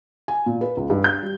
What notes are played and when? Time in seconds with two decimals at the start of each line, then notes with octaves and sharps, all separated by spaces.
0.28 G#5
0.46 A#2
0.61 B4
0.77 C#2
0.90 G2
1.04 G6
1.23 G3